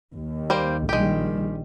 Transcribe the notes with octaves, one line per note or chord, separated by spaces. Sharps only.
D#2
G3 A#3 C5
A#1 D#3 G3 G#3 G4